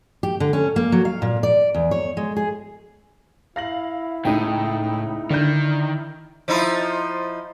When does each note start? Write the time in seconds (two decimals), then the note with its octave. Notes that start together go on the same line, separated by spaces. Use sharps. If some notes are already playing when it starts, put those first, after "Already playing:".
0.23 G4
0.40 D3
0.53 C#4
0.76 A#3
0.92 F#3
1.05 F5
1.22 A#2
1.43 D5
1.74 E2
1.91 C#5
2.17 G#3
2.36 G#4
3.56 E4 F5 A#6 F#7
4.25 C#2 A2 D#4 G5 D#7
5.31 D3 D#3 D4 G6
6.48 F3 D#4 E4